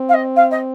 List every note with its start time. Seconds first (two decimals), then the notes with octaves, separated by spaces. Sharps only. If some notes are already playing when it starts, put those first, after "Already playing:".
Already playing: C4
0.08 F5
0.14 D#5
0.36 F5
0.51 D#5